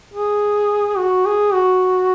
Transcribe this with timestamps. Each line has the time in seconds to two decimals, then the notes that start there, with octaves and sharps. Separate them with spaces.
0.13 G#4
0.98 F#4
1.26 G#4
1.53 F#4